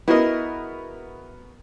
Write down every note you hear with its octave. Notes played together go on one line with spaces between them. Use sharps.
B3 E4 F#4 G#4 A#4 D#5